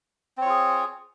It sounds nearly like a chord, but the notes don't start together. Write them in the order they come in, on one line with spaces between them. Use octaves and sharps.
C4 C#5 F4 G#4